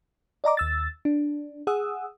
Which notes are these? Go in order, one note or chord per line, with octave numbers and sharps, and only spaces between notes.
D5 D#5 A#5 D6
D#2 E6 A6
D4
G#4 F#5 D#6 E6